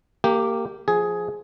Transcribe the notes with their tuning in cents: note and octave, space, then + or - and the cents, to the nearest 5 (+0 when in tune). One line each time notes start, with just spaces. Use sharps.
A#3 -20 G4 +0
F3 +0 G#4 +10